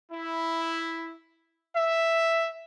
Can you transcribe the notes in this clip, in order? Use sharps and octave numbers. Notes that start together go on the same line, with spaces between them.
E4
E5